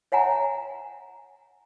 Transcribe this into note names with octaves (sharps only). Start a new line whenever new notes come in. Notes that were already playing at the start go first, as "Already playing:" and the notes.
C#5 E5 F#5 G#5 A#5